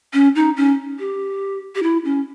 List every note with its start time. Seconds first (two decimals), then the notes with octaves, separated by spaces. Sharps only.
0.14 C#4
0.35 D#4
0.57 C#4
0.99 G4
1.75 G4
1.83 E4
2.05 C#4